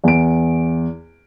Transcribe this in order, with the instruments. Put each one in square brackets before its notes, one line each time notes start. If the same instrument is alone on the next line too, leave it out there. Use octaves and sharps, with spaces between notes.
[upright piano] E2 D7